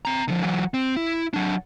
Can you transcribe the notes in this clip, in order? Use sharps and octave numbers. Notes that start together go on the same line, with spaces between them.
C4 A#5
D3 F3
E3 F#3
C4
E4
F#3 D4